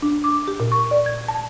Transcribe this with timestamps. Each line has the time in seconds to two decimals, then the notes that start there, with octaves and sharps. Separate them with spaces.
0.02 D4
0.24 D6
0.48 G4
0.60 A#2
0.72 C#6
0.91 D5
1.06 G#6
1.28 A5